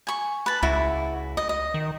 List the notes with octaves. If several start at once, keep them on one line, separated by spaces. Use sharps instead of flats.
G#5 C#6
B4 A5
C#2 E4 F#4
D#5
D#5
D#3